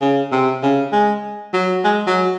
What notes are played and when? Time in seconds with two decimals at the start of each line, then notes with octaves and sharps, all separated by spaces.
0.01 C#3
0.32 C3
0.63 C#3
0.92 G#3
1.54 F#3
1.84 G#3
2.07 F#3